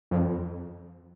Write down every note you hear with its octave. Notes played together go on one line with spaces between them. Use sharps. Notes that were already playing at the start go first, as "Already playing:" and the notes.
F2